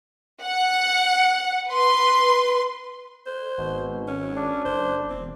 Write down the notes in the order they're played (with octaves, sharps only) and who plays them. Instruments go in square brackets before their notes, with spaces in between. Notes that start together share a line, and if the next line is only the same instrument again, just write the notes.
[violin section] F#5
B4 C6
[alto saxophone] C5
[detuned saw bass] G#1 [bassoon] B2
[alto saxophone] C#4
[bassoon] D4
[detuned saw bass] F#1 [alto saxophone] C5
[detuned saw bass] E1 [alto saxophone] C4